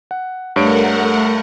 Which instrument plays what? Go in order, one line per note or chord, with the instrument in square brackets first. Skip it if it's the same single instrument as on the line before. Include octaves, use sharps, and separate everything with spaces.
[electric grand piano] F#5
[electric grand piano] G2 C#5 D7 [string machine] A3 A#4 F#5